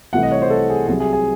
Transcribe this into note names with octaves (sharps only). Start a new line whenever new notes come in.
C2 C3 E3 A3 F#5
D#5
C#5
C5
A4
G#4
C2 C3 F#3 G#4
G#4
G#4